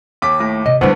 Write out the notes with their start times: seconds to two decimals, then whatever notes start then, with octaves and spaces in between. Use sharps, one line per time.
0.22 D#2 D6 B6
0.40 A2
0.66 C3 D#5
0.81 D2 D3 G3 B3 E4 C5